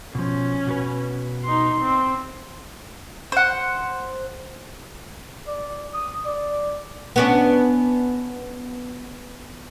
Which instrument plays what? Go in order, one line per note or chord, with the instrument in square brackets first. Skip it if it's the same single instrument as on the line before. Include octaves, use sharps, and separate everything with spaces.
[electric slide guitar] B2 F3 [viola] C#4
[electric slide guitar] B2 F#4 B4
[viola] D#4 C6
C4
[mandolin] C5 F#5
[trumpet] D5
D#6
D5
[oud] B3 C#4 D4